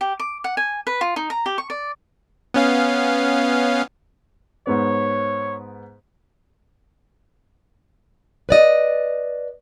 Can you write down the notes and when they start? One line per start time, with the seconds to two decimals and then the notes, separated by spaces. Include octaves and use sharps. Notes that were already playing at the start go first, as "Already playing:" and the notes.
0.01 G4
0.20 D6
0.44 F#5
0.57 G#5
0.87 B4
1.01 F4
1.16 D#4
1.30 A#5
1.46 G4
1.58 C#6
1.70 D5
2.54 B3 C#4 F5
4.67 G#2 B3 C#5
8.49 B4 D5 D#5